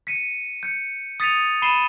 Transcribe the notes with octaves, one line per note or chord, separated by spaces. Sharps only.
B6 C#7 D#7
G6 C#7
D#6 A6 B6 C#7 D#7 F7
B5 C7 D#7 E7 G7